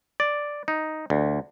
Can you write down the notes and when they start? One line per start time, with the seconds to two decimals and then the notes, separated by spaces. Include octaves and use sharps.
0.20 D5
0.68 D#4
1.10 D2